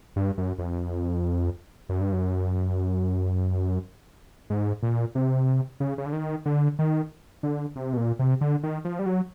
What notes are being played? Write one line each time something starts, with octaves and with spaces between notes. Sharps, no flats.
G2
F#2
F2
F#2
G2
F#2
G#2
A#2
C3
C#3
C#3
D3
D#3
D3
D#3
D3
C3
B2
A#2
C3
D3
D#3
F3
G3
F#3